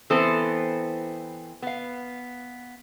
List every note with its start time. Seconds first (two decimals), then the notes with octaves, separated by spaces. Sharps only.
0.10 E3 B3 C4 A4 C5
1.62 B3 F5